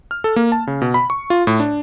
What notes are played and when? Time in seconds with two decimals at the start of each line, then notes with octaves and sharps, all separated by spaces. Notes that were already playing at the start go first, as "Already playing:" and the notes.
0.11 F6
0.24 A4
0.36 A#3
0.52 A5
0.67 C#3
0.82 B2
0.94 B5
1.10 C#6
1.30 F4
1.47 A2
1.60 D4